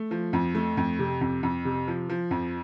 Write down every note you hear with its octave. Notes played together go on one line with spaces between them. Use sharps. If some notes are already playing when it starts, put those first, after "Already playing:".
Already playing: A3
F3
F2
A3
F2
C3
F2
F2
C3
F3
F3
F2